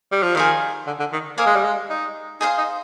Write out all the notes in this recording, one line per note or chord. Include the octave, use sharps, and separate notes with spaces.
G3
F3
D#3 G#4 C5 F5
D3
D3
D#3
A#3 C5 F5 G#5 D#6
G#3
G3
G#3
D#4
D#4 G#4 C5 F5 C6
D#4